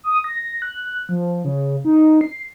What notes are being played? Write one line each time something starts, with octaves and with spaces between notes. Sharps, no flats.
D#6
A#6
F#6
F3
C#3
D#4
C7